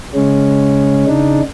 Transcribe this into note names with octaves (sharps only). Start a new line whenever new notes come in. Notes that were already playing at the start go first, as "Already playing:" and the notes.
C#3 G#3 C#4
C#3 D4 D#4